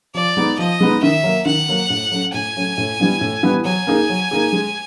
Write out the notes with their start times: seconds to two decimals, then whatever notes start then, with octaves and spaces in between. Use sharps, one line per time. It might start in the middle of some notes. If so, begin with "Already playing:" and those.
0.14 F3 D5
0.37 G#3 B3 D#4
0.59 F3 D#5
0.81 G#3 B3 D#4
1.02 D#3 E5
1.24 F#3 A#3
1.45 D#3 F#5
1.68 F#3 A#3
1.90 A2
2.11 F#3 A3 C#4
2.33 A2 G#5
2.56 F#3 A3 C#4
2.78 A2
2.99 E3 G3 B3
3.21 A2
3.43 E3 G3 B3
3.65 F#3 G#5
3.87 A#3 D#4 G#4
4.10 F#3
4.31 A#3 D#4 G#4
4.52 G#3